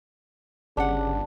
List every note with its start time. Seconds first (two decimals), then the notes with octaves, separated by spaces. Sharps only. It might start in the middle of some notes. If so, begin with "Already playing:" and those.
0.77 G1 C#3 D4 G4 F#5